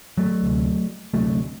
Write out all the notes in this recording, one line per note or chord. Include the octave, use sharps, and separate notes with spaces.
F#3 A3
D2 C3
D2 C3 F#3 A3